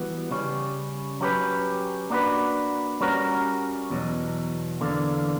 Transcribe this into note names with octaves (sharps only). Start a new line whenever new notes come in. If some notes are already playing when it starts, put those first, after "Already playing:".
Already playing: E3 G3 B3 F#4
C#3 G3 C#4
F#3 C#4 G4 B4
A#3 D4 F#4 B4
G3 C#4 F#4 A#4
E2 B2 F#3
E2 D3 A#3